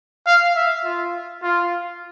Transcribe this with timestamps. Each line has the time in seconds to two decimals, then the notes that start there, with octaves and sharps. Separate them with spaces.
0.27 F5
0.55 E5
0.84 F4
1.42 F4